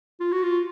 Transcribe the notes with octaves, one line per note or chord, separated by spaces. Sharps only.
F4
F#4
F4